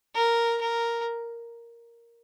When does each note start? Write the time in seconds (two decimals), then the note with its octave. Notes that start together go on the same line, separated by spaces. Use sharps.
0.15 A#4
0.61 A#4